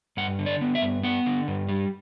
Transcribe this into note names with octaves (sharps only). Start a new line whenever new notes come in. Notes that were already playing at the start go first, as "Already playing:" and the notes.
G2 F#5
D3
D5
B3
E5
G2
B3 F#5
D3
G2
G3